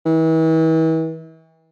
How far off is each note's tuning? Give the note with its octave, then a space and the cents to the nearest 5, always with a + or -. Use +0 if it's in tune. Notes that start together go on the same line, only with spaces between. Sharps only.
E3 -40